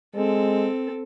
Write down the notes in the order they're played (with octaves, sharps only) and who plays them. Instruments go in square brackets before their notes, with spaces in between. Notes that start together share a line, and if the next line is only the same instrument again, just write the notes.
[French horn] G#3 [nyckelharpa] C4 A4